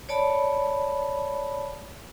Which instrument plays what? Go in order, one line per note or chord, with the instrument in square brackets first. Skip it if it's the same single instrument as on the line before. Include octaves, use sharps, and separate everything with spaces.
[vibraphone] C#5 D5 A5 B5